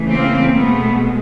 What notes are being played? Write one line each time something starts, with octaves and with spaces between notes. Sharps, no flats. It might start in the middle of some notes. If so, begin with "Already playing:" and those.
Already playing: C#3 E3 A3
A#3 C4
B2 G#3 A3 B3